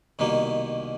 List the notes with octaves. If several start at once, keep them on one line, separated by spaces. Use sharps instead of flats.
C2 B2 D#3 A#3